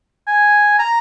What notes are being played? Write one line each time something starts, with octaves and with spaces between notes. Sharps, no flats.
G#5
A#5